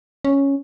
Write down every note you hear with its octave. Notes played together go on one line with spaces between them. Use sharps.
C#4